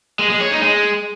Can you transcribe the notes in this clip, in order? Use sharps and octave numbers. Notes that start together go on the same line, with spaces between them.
G#3
G#3
C#5
D#4
G#3